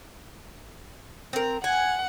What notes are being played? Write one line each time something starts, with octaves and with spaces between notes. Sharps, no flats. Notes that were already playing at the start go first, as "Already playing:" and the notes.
C4 A#4
F#5 G#5